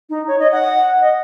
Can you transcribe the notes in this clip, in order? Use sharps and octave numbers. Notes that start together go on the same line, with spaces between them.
D#4
C#5
D#5
F#5
D#5